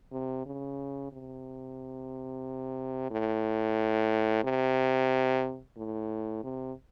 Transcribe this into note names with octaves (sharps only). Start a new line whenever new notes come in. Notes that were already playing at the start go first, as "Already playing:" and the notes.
C3
C#3
C3
A2
C3
A2
C3